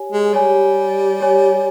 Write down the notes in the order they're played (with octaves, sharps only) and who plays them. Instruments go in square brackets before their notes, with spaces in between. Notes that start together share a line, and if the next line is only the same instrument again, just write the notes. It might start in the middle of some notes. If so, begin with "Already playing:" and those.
Already playing: [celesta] G4 C#5 G#5
[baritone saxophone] G#3
[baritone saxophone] G3 [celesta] G4 C#5 G#5
[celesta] G4 C#5 G#5